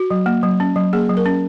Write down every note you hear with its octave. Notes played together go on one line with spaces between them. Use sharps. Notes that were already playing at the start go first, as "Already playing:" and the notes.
Already playing: F#4
F#3
A#3
F#3
C#4
F#3
A#3 G#4
F#3
A#4
C#4